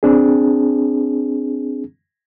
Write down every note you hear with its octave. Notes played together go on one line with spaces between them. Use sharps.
C4 D4 G#4